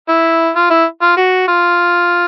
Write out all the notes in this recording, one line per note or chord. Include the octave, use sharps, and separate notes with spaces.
E4
F4
E4
F4
F#4
F4